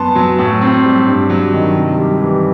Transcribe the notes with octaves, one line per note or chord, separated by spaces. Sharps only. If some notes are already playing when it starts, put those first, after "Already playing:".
Already playing: F#2 B3 A5 C6
F#3
A2
C4
G3
G2
F#3
D#3
C3
G3
E3